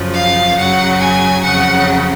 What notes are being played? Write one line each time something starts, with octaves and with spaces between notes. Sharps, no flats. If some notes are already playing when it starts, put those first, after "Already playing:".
Already playing: F#2 C#3 F3
F5
F#2 C#3 F#3 F#5
G#5
F2 C#3 F#3 F#5